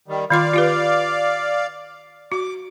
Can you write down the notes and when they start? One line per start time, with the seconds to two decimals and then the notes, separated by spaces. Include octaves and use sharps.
0.08 D#3 G3
0.30 D#3 F4 D5 F5 C6
0.54 F4 G4 B4
2.32 F#4 D6